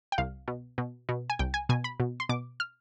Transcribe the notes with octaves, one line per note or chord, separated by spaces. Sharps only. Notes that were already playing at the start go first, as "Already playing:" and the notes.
G5
C2 F5
B2
B2
B2
G#5
C2 G5
G#5
B2 G#5
B5
B2
C6
B2 D6
F6